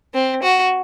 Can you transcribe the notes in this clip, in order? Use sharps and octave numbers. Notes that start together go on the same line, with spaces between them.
C4
F#4